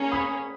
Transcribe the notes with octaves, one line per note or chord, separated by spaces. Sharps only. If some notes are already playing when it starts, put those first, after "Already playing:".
Already playing: A#3 C#4 G#4
B5 D#6